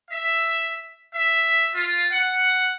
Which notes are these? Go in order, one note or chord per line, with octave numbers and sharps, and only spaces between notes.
E5
E5
F4
F#5